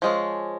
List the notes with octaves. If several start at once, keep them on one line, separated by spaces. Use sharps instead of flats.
F3 G#3 C#4